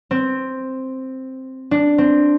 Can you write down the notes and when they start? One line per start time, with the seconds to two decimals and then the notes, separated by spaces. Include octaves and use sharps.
0.11 C4
1.71 D4
1.98 C4